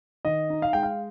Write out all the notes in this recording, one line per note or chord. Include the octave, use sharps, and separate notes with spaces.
D#3 D#5
D#4
F5
G#3 G5
F5